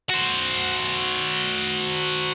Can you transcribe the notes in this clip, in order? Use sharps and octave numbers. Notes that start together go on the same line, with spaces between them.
F#4 C5